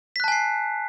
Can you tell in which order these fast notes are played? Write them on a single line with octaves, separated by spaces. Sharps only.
B6 F#6 A5 G#5 C7